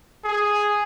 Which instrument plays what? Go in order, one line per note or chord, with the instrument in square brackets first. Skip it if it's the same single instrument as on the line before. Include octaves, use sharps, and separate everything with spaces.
[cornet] G#4